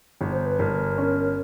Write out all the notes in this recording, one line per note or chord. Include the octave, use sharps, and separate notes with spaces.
G1
C5
B4
G1 A#4
C#4